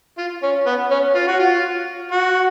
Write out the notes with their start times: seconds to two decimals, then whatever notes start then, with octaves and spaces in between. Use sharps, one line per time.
0.18 F4
0.43 C#4
0.66 B3
0.91 C#4
1.15 F4
1.27 F#4
1.39 F4
2.12 F#4